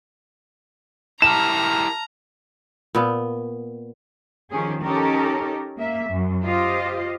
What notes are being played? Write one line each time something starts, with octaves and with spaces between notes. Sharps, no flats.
E4 G4 A#4 A5 A#5 F6 E7
A#2 B3
D#3 F3 C#4 G4 G#4
C#4 D#4 G4 A4 A#4
A#3 E5
F#2
F4 G4 C5 D#5 F5